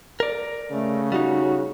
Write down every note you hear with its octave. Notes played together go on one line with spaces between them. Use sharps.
A#4 D5
C#3 A3
G3 D#4 F#4